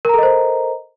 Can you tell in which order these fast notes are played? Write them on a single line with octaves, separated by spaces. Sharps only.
A#4 A#5 A4 D#5 C5